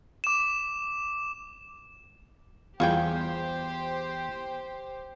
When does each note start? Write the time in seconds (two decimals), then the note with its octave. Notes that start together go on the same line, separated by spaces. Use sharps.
0.24 D6 E7
2.80 E2 G3 F4 G4 G#4 C5 F5 G5